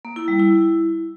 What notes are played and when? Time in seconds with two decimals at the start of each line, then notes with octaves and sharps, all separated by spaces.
0.05 A#3
0.16 E4
0.28 G3
0.39 E4